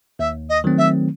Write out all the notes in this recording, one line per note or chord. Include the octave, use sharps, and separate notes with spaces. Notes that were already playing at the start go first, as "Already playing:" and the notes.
D#2 E5
D#5
D#3 F#3 A3 C4
E5